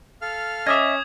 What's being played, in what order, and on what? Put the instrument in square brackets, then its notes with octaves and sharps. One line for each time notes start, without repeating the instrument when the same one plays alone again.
[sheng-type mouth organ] A4 F5 F6
[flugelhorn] C#4 [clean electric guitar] D#5 E5 [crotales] D6 D#6 G#6